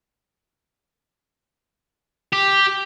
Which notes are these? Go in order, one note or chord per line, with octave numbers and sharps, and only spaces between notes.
G4